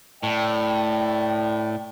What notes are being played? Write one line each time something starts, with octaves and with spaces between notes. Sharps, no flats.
A2 D5 G5